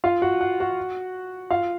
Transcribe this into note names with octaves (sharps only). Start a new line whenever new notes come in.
F4 F5
F#4 F#5
F#5
F#4 F#5
F4 F5